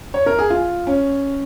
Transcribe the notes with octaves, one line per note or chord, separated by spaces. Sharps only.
C#5
A#4
G#4
F4
C#4